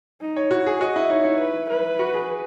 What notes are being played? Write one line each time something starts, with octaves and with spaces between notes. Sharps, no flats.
D#4
C#5
E4 F#4
G#4
F#4 D#5
E4
D#4 C#5
E4
B4
B4
F#4
G#4